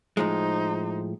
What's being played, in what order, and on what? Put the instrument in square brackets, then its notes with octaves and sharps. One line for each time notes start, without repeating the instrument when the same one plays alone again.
[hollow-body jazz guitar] A2 F3 G#3 [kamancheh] D#4 C5